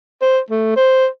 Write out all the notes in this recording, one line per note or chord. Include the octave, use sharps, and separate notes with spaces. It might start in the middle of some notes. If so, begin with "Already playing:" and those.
C5
A3
C5